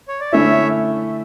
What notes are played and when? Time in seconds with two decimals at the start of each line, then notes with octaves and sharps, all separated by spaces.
0.08 C#5
0.20 D5
0.32 D3 A3 C#4 E4 C#5 E5